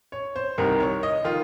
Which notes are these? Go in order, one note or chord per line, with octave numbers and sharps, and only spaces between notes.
C#5
C5
C2 C3 D#3 A#4
C#5
D#5
D#3 F4